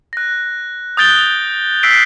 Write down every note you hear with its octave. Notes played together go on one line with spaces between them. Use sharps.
F#6 A#6
D#6 F#6 G6 A6 D7 G7
E6 F#6 B6 C7 D7